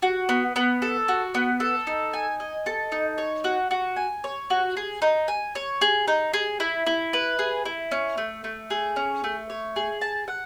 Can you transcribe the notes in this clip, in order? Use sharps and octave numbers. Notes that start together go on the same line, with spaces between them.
F#4
B3
B3
A4
F#4
B3
A4
D#4
G#5
D#5
A4
D#4
C#5
F#4
F#4
G#5
C#5
F#4
G#4
D#4
G#5
C#5
G#4
D#4
G#4
E4
E4
B4
G#4
E4
C#4
A3
A3
G#4
C#4
A3
C#5
G#4
A5
F#5